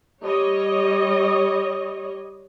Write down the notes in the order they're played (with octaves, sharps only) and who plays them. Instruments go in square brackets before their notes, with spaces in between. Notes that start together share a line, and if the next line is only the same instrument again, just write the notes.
[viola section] G3 C#5 D#5